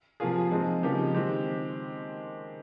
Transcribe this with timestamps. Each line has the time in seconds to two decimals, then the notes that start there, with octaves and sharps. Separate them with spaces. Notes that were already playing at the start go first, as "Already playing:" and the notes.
0.20 C3 F3 A#3 F4 G#4
0.51 F3 G#3 C4 D#4 G#4
0.83 C#3 F3 A#3 D#4 G4
1.14 D#3 G#3 C4 G4